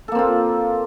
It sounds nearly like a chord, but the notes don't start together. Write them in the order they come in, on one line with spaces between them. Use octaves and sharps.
A4 A#3 C4 F4